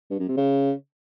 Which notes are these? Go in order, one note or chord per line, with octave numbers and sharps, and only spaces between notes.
G2
F#2
C3
C#3